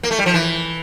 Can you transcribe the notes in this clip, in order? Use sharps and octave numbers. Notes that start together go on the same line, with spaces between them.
A#3
A3
G3
F3
E3